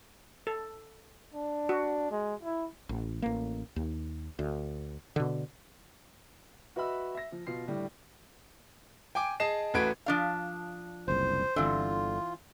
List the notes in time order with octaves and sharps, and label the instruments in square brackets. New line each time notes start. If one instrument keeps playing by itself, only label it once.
[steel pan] A4
[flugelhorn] D4
[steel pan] F#4
[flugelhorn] G#3
E4
[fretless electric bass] A1
A1 A#3
D#2
D2
B2 D3
[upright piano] F#4 B4 D#5 E5 B5 E6
E5 A#6
F3
B2 F4 C7
A2 D3 G3 D4
[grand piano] G5 G#5 D6 D7
G#4 D#5 A5 C7 E7
A1 A3 F#4 B4 G#6 D7
[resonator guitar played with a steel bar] F3 D4 F5
[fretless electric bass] F#1 C2 [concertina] C5
[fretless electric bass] G1 D3 [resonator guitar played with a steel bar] E3 C4 [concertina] F4